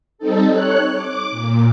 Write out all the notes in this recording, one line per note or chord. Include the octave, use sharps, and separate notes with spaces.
G3 C4 D#4 A4
C#5 F#6
D6
A#2